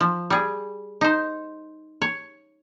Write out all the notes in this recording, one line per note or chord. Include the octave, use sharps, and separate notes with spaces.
F3
G3 G#4
D#4 C5
C#5